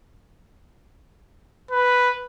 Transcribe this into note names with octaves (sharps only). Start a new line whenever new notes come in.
B4